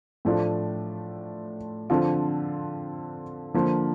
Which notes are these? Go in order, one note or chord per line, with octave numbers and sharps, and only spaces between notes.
A2 F3 A3 D4 F4
D3 F3 C4 F4
D3 F3 A#3